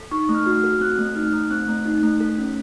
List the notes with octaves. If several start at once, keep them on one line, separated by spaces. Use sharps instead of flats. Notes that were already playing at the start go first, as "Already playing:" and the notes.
Already playing: A4
D#4 C#6
A3
F6
F#4
F6
A4
C4 F#6
A3
D#4 F6
A3
C4 F#6
A3
D#4
A3
A4
C#4